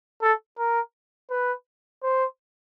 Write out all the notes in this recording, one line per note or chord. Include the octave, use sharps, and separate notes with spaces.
A4
A#4
B4
C5